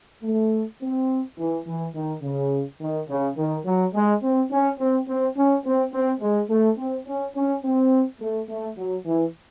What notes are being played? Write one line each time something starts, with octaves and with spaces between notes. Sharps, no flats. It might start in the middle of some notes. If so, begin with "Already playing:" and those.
A3
C4
E3
E3
D#3
C#3
D#3
C#3
D#3
F#3
G#3
C4
C#4
C4
C4
C#4
C4
C4
G#3
A3
C4
C#4
C#4
C4
A3
A3
F#3
E3